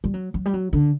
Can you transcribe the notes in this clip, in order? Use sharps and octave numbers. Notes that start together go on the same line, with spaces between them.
G3
F#3
F#3
G3
F#3
D3